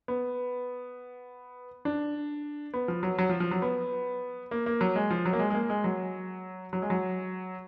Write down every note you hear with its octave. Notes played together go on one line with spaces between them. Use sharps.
B3
D4
B3
F3
F#3
F#3
F3
F3
F#3
B3
A#3
A#3
F#3
G#3
F3
F#3
A#3
G#3
G#3
A#3
G#3
F#3
F#3
G#3
F#3